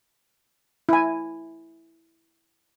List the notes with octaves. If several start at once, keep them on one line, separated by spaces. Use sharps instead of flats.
E4 G#5